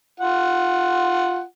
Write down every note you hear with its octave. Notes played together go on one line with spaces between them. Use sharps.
F4 F#5